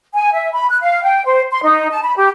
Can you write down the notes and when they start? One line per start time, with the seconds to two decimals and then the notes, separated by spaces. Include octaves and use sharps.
0.14 G#5
0.34 E5
0.52 B5
0.70 F#6
0.82 F5
1.04 G5
1.26 C5
1.51 C6
1.63 D#4
1.91 A5
2.03 B5
2.17 G4